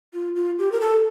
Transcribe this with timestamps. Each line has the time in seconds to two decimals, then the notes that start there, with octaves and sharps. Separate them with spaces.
0.14 F4
0.36 F4
0.59 G4
0.72 A#4
0.81 A4